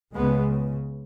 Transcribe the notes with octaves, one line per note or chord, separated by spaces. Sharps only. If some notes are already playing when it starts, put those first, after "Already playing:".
C#2 C#3 G#3 B3